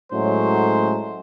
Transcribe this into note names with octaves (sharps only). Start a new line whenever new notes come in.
A2 F#3 G#3 A3 C#4 C5